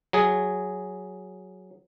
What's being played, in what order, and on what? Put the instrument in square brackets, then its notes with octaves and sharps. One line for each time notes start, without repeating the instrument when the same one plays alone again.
[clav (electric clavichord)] F#3 G#4